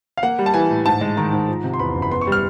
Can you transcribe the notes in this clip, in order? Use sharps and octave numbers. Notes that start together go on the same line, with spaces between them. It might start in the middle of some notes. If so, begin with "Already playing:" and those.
F5
A#3 F#5
G3
A5
E3 G#5
A2
G#2 A5
G#3
D#3 A#5
G#2
F3
C3
C6
E2 B5
F#1
B5
B3 C6
C#6
G3
F6